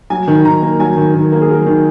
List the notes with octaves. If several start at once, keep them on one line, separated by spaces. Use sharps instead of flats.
F#3 G#5
D#3
D#3 A#5
A#3
F#3 G#5
D#3
D#3
A#3
G#4
F#3 A#4
D#3